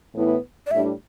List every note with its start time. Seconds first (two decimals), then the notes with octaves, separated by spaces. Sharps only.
0.15 A2 E3 B3 E4
0.67 D5
0.71 A2 G3 D4 E5